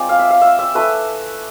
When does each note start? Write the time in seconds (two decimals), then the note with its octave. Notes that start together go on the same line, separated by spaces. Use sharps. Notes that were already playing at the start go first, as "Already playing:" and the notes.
Already playing: G#3 C4 F4 C5 D5
0.09 F5
0.19 E5
0.30 F5
0.42 E5
0.59 E5
0.75 A3 E4 B4